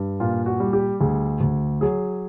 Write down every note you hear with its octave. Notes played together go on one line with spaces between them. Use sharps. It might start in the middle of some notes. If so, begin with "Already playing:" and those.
Already playing: G2
A#2 F4
F#4
G3
G4
D2 G#4
D2
F#3 G#4